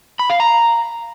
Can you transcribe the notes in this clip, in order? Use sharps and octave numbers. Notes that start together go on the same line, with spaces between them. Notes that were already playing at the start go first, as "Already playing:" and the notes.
B5
F5
A#5